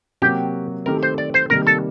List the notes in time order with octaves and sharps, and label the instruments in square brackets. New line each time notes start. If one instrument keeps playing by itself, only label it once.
[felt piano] C3 F#3 A#3 F#4 [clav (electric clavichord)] G4
[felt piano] D#3 A3 C4 G4 [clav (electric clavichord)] A#4
[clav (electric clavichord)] C5
D5
C5
[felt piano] C3 D#3 G3 A#3 [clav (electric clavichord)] A#4
[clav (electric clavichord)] A4